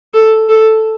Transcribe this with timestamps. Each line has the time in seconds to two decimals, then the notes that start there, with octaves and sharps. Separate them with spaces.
0.14 A4
0.49 A4